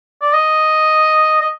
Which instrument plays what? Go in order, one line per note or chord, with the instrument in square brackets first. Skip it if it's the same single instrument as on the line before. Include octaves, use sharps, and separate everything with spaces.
[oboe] D5
D#5
D#5